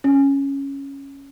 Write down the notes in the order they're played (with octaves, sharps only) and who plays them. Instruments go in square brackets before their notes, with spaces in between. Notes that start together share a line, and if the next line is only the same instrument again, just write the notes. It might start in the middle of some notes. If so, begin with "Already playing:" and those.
[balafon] C#4